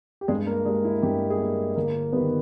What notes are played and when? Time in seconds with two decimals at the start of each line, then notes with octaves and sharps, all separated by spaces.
0.21 G4
0.28 G2 G#3 G#4
0.47 A#3 A#4
0.65 G3 G#3 A#3 G#4
0.85 E4
1.02 G2 G4
1.30 G#4
1.39 G3 A#3 G4
1.76 G1 A#3 A#4
2.12 D#3 G3 A#3 B3 B4